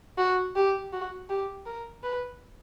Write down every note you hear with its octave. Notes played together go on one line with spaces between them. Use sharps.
F#4
G4
F#4
G4
A#4
B4